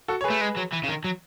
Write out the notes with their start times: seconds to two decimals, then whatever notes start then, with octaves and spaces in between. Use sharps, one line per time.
0.08 F#4 A4
0.21 C#5
0.24 G#4 B4
0.30 A3
0.41 G#3
0.56 F#3
0.72 E3
0.83 C#3
0.88 D#3
1.04 F#3